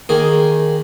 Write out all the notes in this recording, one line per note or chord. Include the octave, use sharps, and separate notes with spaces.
D#3 A#3 G#4